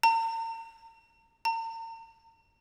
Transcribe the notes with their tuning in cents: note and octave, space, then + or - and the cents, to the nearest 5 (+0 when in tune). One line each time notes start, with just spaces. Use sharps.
A#5 -45
A#5 -45